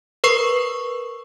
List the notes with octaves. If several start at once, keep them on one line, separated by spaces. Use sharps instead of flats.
A#4 B4 C#6 C7